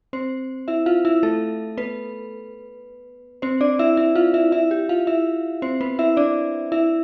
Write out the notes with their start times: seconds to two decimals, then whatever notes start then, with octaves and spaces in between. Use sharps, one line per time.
0.13 C4 C5
0.68 E4 E5
0.86 F4 F5
1.05 E4 E5
1.23 A3 A4
1.77 B3 B4
3.42 C4 C5
3.61 D4 D5
3.79 E4 E5
3.97 E4 E5
4.15 F4 F5
4.34 E4 E5
4.52 E4 E5
4.71 G4
4.89 F4 F5
5.07 E4 E5
5.62 C4 C5
5.81 B3 B4
5.99 E4 E5
6.17 D4 D5
6.72 E4 E5